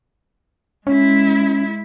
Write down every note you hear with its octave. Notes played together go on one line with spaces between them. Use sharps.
G#3 C#4 E4